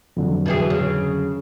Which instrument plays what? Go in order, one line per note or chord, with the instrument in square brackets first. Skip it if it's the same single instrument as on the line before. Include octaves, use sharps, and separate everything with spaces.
[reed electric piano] F2 D3 F#3
[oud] B2 E3 G#4
C#3